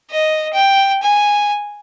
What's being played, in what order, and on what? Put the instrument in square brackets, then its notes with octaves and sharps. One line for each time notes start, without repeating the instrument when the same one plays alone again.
[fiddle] D#5
G5
G#5